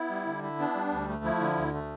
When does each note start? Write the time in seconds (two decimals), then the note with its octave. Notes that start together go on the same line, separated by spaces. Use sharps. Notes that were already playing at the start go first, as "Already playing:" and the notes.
Already playing: B3 E4
0.10 G3
0.26 D3
0.43 E4
0.59 B3 D4
0.75 G3
0.92 D2
1.08 A3
1.24 F3 E4
1.41 D3
1.57 D2
1.74 A3